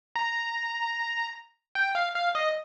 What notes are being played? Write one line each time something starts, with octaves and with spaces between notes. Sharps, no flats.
A#5
G5
F5
F5
D#5